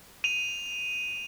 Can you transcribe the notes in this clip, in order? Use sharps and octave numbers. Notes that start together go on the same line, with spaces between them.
D#7 F7